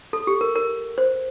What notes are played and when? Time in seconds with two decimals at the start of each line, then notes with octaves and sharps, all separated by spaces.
0.13 A4
0.27 G4
0.41 A#4
0.55 A#4
0.98 C5